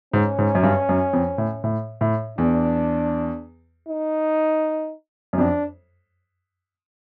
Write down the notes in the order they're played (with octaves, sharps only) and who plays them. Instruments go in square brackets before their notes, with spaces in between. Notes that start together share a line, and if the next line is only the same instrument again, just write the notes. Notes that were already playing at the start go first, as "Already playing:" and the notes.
[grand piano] G#2 [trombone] C#4
[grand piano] G#2
F#2
G2
F#2
F2
A2
A2
A2
[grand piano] E2 [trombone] D4
[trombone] D#4
[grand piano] F#2
[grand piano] F2 [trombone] D4